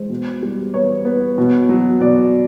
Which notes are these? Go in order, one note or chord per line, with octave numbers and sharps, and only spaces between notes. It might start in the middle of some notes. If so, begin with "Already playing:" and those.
Already playing: G#3 C5
B2
G3
B3 C#5
B3
B2
F#3
B2 D5